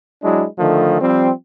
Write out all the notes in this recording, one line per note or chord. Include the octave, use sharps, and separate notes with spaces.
F#3 G#3 D4 E4
D3 D#3 F3 A3
F3 G3 C4